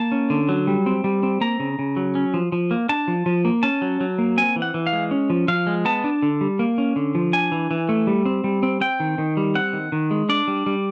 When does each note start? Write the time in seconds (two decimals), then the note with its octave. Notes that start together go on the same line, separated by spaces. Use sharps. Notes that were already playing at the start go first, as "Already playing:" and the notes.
Already playing: A#3 A5
0.12 C#4
0.30 D3
0.49 F#3
0.67 G3
0.86 C4
1.04 G3
1.23 C4
1.41 A#3 A#5
1.60 C#3
1.79 C#3
1.97 F#3
2.15 C#4
2.34 F3
2.52 F3
2.71 A#3
2.89 D4 A5
3.08 F3
3.26 F3
3.45 A#3
3.63 C#4 A5
3.82 F#3
4.01 F#3
4.18 A#3
4.37 C4 G#5
4.56 E3
4.62 F#5
4.74 E3
4.87 F5
4.93 G#3
5.11 C#4
5.30 F3
5.48 F3 F5
5.67 G#3
5.85 B3 A5
6.04 D4
6.22 D3
6.41 G3
6.59 A#3
6.78 C#4
6.96 D3
7.15 F3
7.33 D4 G#5
7.52 E3
7.71 E3
7.89 A3
8.07 G3
8.26 C4
8.44 G3
8.63 C4
8.81 C4 G5
9.00 D#3
9.18 D#3
9.37 G3
9.55 C4 F#5
9.73 D#3
9.92 D#3
10.11 G#3
10.29 D4 D5
10.48 G3
10.66 G3